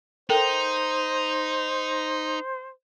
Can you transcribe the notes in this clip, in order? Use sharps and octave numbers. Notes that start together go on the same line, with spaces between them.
D#4 A4 A#4 C5 G5